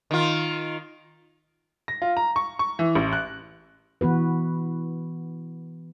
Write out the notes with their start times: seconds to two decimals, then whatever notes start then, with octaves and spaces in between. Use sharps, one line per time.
0.11 D#3 F4
1.88 A#6
2.02 F4
2.17 A#5
2.36 C#6
2.59 C#6
2.79 E3
2.95 A1
3.13 F#6
4.01 E3 B3 F#4 B4